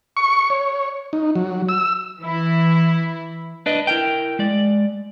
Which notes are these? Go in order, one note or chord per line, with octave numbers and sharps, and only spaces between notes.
C#6
C#5
D#4
F#3
E6
E3 E4
D4 B4 D#5
E4 A#4 G5
G#3 D5